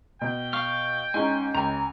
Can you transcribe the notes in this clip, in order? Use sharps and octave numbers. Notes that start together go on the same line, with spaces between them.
B2 G5
F5 C#6 F6
G#2 C#4 D#4 G#5
C#2 G#5 A#5